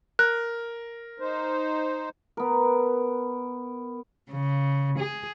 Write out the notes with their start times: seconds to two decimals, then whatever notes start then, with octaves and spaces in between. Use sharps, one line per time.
0.19 A#4 F#6
1.20 D#4 C5
2.37 B3 A#4
4.30 C#3
4.99 G#4